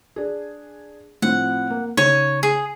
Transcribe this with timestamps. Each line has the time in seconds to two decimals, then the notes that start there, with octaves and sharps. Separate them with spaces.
0.16 D4 G#4
1.22 A2 F3 C4 F#5
1.70 A#3
1.97 C#3 D#4 C#5 D#7
2.43 G#4